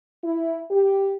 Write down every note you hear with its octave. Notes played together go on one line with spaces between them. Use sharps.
E4
G4